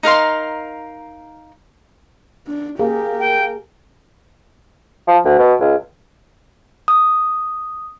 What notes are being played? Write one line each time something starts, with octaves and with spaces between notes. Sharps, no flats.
D#4 A#4 F5 C6
D4
A#3 G4 G#4 A#4
G5
F3
D2
B2
C#2
D#6